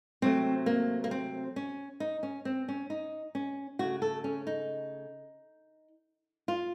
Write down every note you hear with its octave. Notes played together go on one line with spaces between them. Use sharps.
C3 F#3 A3 C4
A#3
A#3
C4
C#4
D#4
C#4
C4
C#4
D#4
C#4
C#3 A3 F#4
A4
C#4
D#4
F4